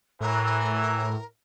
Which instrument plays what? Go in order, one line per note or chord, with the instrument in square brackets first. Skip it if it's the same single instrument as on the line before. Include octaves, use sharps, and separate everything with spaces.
[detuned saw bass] A2 [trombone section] E3 F#3 [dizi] A#4